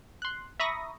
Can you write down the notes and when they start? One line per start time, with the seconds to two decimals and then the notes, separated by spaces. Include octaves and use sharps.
0.22 C6 F#6
0.60 E5 A#5 B5 C#6 D#6 A#6